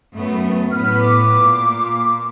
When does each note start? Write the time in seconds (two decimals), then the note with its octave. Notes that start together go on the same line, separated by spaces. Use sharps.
0.14 F#2 A3 B3
0.70 A2 B3 B4 F6
0.99 D6
1.36 A#2